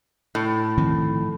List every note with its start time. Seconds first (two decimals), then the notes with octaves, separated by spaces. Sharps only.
0.35 A2
0.78 D#3 F3 C4